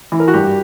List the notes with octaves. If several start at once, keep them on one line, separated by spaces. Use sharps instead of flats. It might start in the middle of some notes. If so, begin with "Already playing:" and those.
E3
A#4
F#4
G2 G4